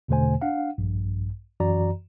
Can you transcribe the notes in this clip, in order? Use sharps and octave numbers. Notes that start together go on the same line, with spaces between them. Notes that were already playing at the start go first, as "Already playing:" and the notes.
E2 B2 D3 A3 C5 G#5
D4 F5 F#5
A#1 G2
F#2 E3 F#4 D5 A#5